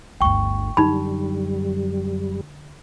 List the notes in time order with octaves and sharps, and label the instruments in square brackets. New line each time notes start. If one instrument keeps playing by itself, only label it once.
[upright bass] G1 D2 [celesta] G5 C#6
[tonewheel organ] F#2 G3 [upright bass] D3 [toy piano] D#4 B5